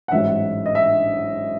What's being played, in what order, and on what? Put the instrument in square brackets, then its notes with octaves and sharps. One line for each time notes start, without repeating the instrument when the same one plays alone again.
[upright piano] F#5
A1 G#2 F#3 E5
D#5
E5